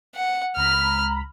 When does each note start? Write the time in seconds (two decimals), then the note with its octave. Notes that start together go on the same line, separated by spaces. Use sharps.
0.15 F#5
0.56 C#2 A#5 B5 F6